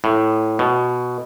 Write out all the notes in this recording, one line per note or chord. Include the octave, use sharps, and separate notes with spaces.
A2
B2